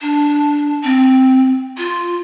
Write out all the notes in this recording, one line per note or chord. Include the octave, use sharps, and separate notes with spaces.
D4
C4
F4